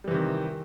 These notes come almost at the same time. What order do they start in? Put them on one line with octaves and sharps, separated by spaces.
G3 E3 C3 D#3